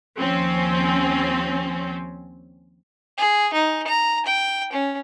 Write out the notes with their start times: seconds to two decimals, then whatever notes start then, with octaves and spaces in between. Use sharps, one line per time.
0.18 D#2 F3 C4 C#4
3.18 G#4
3.54 D#4
3.87 A#5
4.26 G5
4.73 C#4